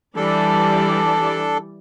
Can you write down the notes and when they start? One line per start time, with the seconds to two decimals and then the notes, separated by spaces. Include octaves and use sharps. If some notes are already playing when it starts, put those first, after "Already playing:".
0.16 E3 G3 D4 A4 D5